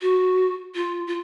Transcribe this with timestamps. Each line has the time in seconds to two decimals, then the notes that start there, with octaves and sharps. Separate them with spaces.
0.02 F#4
0.75 F4
1.07 F4